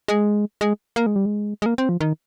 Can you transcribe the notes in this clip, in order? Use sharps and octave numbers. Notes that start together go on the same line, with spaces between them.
G#3
G#3
A#3
G#3
G3
G#3
G#3
A#3
C4
F3
D#3